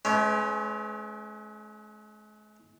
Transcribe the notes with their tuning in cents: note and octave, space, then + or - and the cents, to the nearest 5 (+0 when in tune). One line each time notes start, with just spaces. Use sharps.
G#3 +45 C#4 +0 B4 +40